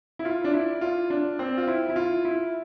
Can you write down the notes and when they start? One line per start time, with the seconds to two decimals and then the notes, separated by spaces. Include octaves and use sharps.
0.19 E4
0.25 F4
0.44 D4
0.53 E4
0.81 F4
1.10 D4
1.39 C4
1.57 F4
1.67 E4
1.89 E4
1.96 F4
2.25 E4